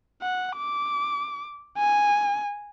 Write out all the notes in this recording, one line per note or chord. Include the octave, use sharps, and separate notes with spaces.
F#5
D6
G#5